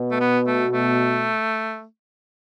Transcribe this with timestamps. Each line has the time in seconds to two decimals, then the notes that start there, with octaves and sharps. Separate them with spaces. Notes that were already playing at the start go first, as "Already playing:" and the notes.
Already playing: B2
0.11 A3
0.20 B3
0.47 A3
0.73 A3